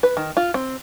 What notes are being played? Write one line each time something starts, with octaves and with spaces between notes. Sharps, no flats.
B4
D#3
F4
C4